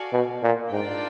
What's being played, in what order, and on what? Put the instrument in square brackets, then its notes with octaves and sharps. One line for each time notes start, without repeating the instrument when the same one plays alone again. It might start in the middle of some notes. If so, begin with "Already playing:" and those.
Already playing: [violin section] F#4 A4 D5 F5 G#5
[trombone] B2
A#2
[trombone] G#2 [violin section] D4 F4 A#4 D5 G5